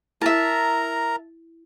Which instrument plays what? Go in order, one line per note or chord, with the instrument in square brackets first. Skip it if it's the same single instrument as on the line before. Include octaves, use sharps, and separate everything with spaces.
[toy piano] E4 [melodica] A#4 A#5 [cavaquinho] E5 A5